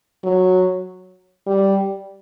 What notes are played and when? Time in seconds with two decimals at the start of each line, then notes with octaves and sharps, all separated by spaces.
0.24 F#3
1.47 G3